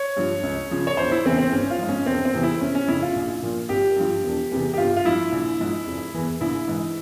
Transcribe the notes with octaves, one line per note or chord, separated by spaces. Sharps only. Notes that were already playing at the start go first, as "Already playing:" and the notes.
Already playing: C#5
G2 F3
C#2
C#3 F3
C#5
E1 C5
E4
E2 C#3 E3 C4
C4
G#1 C#4
F4
G#2 F3
C#4
E1 C4
C4
E2 C3 E3
E4
F1 C#4
C#4
F2 C#3 E4
F4
A#1
A#2 F3
G#1 G4
G2 F3
E1
E2 C3 E3
G4
G1 F4
F4
G2 F3 E4
A#1
G#2 F3
F1
E2 E3
A#1 E4
G#2 E3